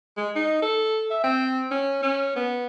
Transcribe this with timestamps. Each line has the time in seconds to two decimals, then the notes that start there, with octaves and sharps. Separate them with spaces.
0.17 G#3
0.36 D#4
0.62 A4
1.11 E5
1.23 C4
1.71 C#4
2.03 C#4
2.36 B3